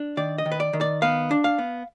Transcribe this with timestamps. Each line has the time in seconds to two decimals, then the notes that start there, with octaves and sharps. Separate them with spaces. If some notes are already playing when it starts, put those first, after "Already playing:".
Already playing: D4
0.17 D#3 D5
0.38 D#5
0.46 D#3
0.52 B4
0.60 D5
0.73 D#3
0.81 D5
1.02 B3 F5
1.31 D4
1.44 F5
1.58 B3